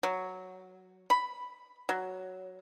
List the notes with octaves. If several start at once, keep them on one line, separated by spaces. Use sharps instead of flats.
F#3
B5
F#3